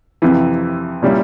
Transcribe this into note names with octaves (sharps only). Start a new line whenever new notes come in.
F2 C3 E3
A#2 G3 C#4 E4